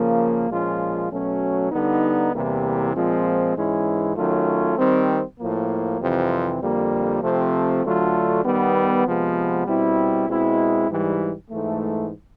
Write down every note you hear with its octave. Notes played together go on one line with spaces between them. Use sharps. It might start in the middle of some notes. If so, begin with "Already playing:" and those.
Already playing: C#3 F3 A#3
A#2 F3 G#3 C#4 F4
B2 F#3 A3 C#4
D3 G3 B3 D#4
E2 C3 E3 G3 A#3
A#2 F3 G#3 C4
G#2 E3 G#3 C#4 E4
D#3 F#3 A3 C#4 F4
D#3 G3 C4
A2 F3 A#3
F2 C3 E3 G3 C4
F2 D3 G3 A#3
C3 F3 A3 C4
D3 F#3 A3 D4 F4
D#3 G3 B3
C3 F3 G#3 B3
B2 G3 C4 E4
B2 G#3 C4 E4
G#2 E3 G3
G#2 E3 A3